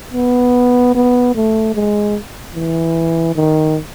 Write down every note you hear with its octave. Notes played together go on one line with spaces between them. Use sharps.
B3
B3
A3
G#3
E3
D#3